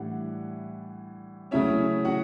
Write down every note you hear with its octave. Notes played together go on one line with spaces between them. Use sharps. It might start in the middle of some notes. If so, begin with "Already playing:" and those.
Already playing: A2 E3 G3 D4 F#5
C#3 F#3 A3 C#4 E4 E5
F#4 F#5